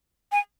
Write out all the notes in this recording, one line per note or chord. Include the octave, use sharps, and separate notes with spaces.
G#5